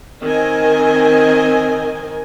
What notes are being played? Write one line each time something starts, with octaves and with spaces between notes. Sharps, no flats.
D#3 C4 D#5 G#5